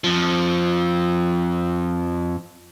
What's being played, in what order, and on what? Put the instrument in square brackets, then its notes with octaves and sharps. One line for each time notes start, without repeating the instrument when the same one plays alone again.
[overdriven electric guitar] F2 F3